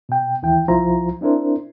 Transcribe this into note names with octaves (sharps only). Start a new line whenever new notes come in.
B2 G5
D#2 E3 E4 G5
C2 F3 E4 F4 C5 A#5
C4 D4 E4 A#4 C5